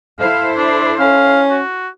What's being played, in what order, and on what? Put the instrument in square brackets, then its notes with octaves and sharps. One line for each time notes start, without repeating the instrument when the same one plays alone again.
[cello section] E4 A4 C5 [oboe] F5
[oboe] D4
[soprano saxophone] C#4 [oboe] F5
[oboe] F#4